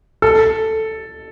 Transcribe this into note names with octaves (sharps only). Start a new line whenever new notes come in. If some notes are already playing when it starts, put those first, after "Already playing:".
A4